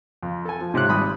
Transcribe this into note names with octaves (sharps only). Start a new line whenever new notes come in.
F2
A4 G#5
F3
G#2 C3 C5 C#5 F#6
G#1 G3 B5 D#6 F#6